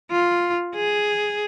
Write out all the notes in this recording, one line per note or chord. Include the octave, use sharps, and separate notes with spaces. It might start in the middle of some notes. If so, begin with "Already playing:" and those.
F4
G#4